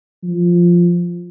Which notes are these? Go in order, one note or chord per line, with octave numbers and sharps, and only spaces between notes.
F3